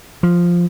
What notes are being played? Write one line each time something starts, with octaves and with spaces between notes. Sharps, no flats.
F3